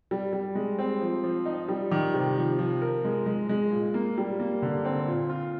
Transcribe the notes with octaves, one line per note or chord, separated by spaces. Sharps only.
G3
G3
G#3
C4
F3
F3
D#4
G3
D#3
C3
F3
F3
A#4
G#3
G#3
G#3
A#2
A#3
G3
A#3
D3
C4
A#2
F4